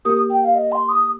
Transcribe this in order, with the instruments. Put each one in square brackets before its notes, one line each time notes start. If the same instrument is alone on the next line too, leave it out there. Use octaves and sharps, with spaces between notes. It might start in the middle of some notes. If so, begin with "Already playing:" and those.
[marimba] A#3 G4 A#4 [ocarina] D#6
[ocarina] G5
F5
D#5
C6
D#6